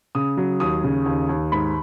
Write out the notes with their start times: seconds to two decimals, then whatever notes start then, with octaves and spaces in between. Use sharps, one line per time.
0.15 C#3 D#6
0.37 F#3
0.60 D#2 D#6
0.84 C#3
1.06 D#2
1.29 D#2
1.52 G#2 B5